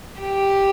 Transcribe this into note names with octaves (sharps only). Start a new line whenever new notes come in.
G4